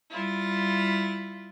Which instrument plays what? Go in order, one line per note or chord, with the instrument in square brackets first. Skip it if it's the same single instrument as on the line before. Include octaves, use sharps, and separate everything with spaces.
[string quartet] G3 E4 F4